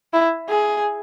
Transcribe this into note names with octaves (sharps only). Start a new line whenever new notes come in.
E4
G#4